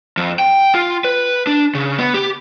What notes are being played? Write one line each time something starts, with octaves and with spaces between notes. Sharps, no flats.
F2
G5
F4
B4
D4
C#3
B3
G4